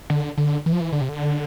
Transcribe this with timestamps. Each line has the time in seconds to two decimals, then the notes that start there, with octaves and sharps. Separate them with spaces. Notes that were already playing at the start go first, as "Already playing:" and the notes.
0.10 D3
0.38 D3
0.66 E3
0.72 F3
0.80 E3
0.92 D3
1.01 C3
1.09 D3